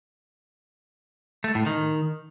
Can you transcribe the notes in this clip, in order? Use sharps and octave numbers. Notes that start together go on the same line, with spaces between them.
A3
A2
D#3